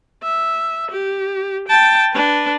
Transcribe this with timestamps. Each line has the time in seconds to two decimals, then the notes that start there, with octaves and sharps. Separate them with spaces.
0.23 E5
0.91 G4
1.69 G5 A5
2.12 D4 B4